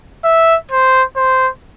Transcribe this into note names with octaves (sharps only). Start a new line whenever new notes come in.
E5
C5
C5